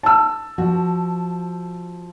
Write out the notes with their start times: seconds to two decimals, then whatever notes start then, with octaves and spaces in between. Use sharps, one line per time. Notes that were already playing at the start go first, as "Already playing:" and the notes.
0.03 A5 E6
0.58 F3 F#4